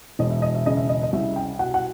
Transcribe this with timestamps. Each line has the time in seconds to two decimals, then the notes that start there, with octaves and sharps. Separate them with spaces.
0.19 E1 D#5
0.31 E5
0.42 D#5
0.55 E5
0.66 C#3 D#5
0.77 E5
0.89 D#5
1.03 D#5
1.13 C2 E5
1.36 G5
1.59 B2 F#5
1.74 F#5